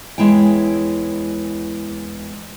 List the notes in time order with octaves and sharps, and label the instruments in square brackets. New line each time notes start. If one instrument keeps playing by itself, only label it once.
[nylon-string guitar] E2 G#3 E4 C#5 G5